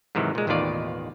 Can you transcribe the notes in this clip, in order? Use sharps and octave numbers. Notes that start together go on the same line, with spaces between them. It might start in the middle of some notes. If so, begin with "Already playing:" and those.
G#2 C3 D#3 E3 F#3
A#2 G#3
A1 D#2 B2 D#3 F4 D5